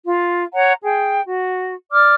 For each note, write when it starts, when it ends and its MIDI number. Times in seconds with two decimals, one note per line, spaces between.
0.05 0.43 65
0.54 0.73 73
0.54 0.73 78
0.54 0.73 82
0.83 1.21 68
0.83 1.21 79
1.27 1.75 66
1.92 2.15 74
1.92 2.15 86
1.92 2.15 89